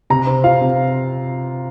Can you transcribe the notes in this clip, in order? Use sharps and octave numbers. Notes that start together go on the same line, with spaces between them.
C3 A#5
C4
F4 F5
C3